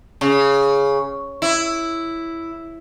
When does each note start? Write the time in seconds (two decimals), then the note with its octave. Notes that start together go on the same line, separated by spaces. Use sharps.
0.21 C#3
1.42 E4